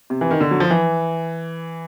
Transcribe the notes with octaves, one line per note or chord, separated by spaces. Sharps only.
C3
E3
D#3
D3
F#3
F3
E3